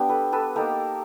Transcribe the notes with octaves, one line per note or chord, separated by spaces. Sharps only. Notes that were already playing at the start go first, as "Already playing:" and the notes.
Already playing: G3 B3 D4 G4
A4 B4
A4 B4
A#3 D#4 G4 A4